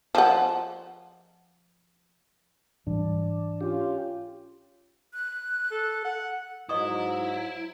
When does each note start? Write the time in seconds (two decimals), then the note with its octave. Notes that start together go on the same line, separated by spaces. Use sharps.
0.15 F3 F#5
2.87 G#2 E3 G3 D4
3.61 C#4 F4 G4
5.13 F#6
5.71 A4
6.05 F#5
6.69 G#2 F#3 E4 D#5 C#6 D#6